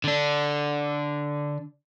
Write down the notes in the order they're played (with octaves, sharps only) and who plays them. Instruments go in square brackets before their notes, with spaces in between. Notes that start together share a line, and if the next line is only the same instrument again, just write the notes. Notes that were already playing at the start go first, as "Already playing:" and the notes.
[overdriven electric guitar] D3 D4